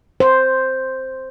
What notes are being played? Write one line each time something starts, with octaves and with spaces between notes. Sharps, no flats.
C5